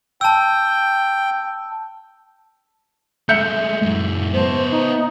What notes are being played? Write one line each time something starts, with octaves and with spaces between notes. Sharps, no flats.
G5 A5 E6
G#3 A3 E5 G6 C#7
F#2 G#3
B3 C5 A5
D#4